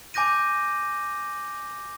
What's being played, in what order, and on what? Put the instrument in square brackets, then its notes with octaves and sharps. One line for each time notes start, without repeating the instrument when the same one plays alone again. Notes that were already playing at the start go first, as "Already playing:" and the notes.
[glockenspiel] G#5 D6 G6 A#6 D#7